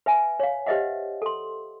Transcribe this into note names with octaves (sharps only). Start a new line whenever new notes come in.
B4 E5 G#5
C#5 F5
G4 B4 C5 D#5 E5 F#5
A4 C6